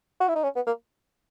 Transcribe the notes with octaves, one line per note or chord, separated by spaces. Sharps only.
F#4
E4
D#4
C#4
B3
A#3